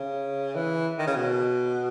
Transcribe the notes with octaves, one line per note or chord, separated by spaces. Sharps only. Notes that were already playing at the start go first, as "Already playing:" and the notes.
Already playing: C#3
E3
D#3
C#3
B2